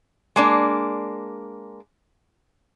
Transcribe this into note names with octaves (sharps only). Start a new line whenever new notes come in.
G#3 A#3 D4